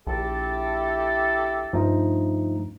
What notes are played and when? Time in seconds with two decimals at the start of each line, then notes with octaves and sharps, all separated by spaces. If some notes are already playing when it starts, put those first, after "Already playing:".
0.07 A#1 E4 G4 A4
1.73 G2 F3 A3 D#4